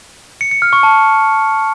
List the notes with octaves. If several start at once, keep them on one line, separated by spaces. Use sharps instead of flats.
C#7
C#7
F6
C#6
A5